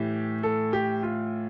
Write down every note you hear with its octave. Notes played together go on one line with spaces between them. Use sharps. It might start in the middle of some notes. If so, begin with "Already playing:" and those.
Already playing: A2 E3 G4
A4
G4
F4